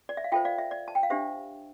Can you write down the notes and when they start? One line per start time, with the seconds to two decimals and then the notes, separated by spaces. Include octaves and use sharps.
0.09 D5
0.17 E5
0.24 F5
0.32 F4 A4 C5 E5 G5
0.45 D5 F5
0.58 E5
0.71 D5
0.88 A5
0.95 G5
1.03 F5
1.10 D4 G4 C5 E5